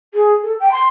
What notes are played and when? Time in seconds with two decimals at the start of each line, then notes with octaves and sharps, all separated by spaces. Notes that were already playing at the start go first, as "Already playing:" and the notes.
0.14 G#4
0.43 A4
0.59 G5
0.72 C6